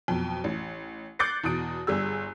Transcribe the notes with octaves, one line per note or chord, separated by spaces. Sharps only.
F2 B2 F#3
A1
D6 F#6 G6 A6 C7 C#7
E2 B2 D#6 D7
G1 G3 G#4 E6